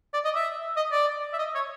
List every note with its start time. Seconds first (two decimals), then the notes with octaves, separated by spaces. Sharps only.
0.14 D5
0.25 D#5
0.35 E5
0.77 D#5
0.92 D5
1.33 E5
1.39 D#5
1.55 C#5